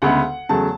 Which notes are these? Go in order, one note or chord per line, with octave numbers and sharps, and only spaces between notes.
D2 C#3 G#3 B3 F#5
E2 C#3 F#3 A3 A5